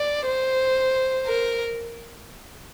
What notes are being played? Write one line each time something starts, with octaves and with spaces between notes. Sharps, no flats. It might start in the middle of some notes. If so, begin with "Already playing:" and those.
Already playing: D5
C5
A#4